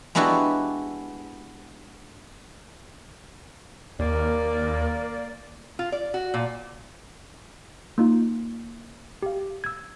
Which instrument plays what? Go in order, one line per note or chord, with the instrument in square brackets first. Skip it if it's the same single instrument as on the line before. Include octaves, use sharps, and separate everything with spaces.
[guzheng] G#3 B3 D4 E4 F#4 G4
[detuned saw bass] D#2 [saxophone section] A#3 [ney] A#4 [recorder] D5
[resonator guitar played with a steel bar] F4
D5
F#4
A#2
[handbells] A#3 D#4 F4
G4 F5
E6 G#6